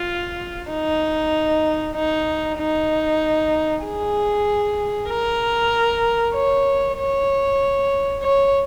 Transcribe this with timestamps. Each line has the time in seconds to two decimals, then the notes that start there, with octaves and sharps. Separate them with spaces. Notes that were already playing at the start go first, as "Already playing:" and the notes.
Already playing: F4
0.70 D#4
1.95 D#4
2.58 D#4
3.84 G#4
5.09 A#4
6.34 C#5
6.97 C#5
8.23 C#5